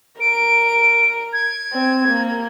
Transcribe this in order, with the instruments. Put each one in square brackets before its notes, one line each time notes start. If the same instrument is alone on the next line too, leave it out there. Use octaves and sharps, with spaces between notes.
[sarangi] A#4 [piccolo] D7
[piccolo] G#6
[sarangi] C4
A#3